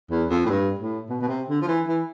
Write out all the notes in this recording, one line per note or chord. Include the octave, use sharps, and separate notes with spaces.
E2
F2
A2
G2
A2
B2
B2
C3
D3
F3
E3
E3